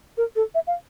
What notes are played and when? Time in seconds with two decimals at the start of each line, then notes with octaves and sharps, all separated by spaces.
0.17 A#4
0.36 A4
0.55 E5
0.67 F5